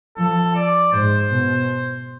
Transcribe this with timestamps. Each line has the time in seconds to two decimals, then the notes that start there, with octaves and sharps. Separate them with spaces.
0.17 F3 A4
0.55 D5
0.93 G#2 C5
1.31 B2